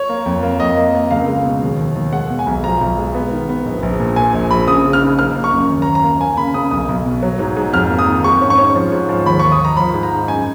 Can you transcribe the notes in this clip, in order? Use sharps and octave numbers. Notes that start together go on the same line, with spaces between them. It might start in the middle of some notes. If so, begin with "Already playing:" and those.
Already playing: C#5
A#3
F2
A#3
F2 D#5
A#3
A#3
C#2 F5
G#3
B2
D#2
D#2
D#2
G#3 F#5
B2
G#5
B1
F3 A#5
B1
G#3
B3
D#3
B3
A#1
A#1
A#2
A#2 G#5
A#1
A#1 B5
C#3 D#6
C#3
F6
D#4
A#3 F6
A#3
C#6
F#2
D#2
A#5
D#2
A#5
A#3
A#3 G#5
C#3 B5
C#3 D#6
B1 D#6
B1
B2
F#3
G#2
G#2
F2 F6
A#3
D#6
D#3
G#2 C#6
C#4
C#6
C#4
F3
G#2
F3
D#2 B5
D#2 C#6
D#6
D#2 A#5
F3 B5
G#2
A#5
D#4
F#2 G#5